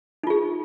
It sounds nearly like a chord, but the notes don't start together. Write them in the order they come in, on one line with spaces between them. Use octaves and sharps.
D#4 F4 G#4